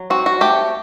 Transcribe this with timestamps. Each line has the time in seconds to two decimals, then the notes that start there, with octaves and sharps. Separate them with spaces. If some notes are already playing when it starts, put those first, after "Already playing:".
Already playing: F#3
0.10 C4 F#4
0.26 F#4
0.41 A3 G4